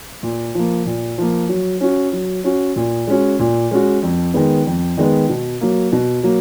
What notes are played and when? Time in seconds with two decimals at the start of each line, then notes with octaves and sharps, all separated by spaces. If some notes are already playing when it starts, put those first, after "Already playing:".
0.23 A#2
0.54 F3 A#3
0.86 A#2
1.18 F3 A#3
1.49 F#3
1.81 C#4 F#4
2.13 F#3
2.44 C#4 F#4
2.76 A#2
3.07 G#3 C#4 F#4
3.39 A#2
3.71 G#3 C#4 F#4
4.02 F2
4.34 D#3 G#3 B3
4.66 F2
4.97 D#3 G#3 B3
5.29 B2
5.61 F#3 A#3
5.92 B2
6.23 F#3 A#3